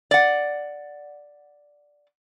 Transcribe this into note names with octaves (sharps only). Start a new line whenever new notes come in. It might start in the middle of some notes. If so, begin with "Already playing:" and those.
D5 F#5